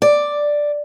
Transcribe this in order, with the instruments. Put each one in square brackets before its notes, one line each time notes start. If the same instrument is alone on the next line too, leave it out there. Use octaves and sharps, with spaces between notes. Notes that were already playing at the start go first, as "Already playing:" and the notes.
[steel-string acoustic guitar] D5